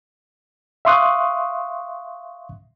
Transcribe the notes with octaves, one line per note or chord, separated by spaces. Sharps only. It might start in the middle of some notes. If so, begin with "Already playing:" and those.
E5 F5 C6 C#6 D#6 F#6